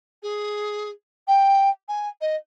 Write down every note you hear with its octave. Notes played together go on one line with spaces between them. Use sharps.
G#4
G5
G#5
D#5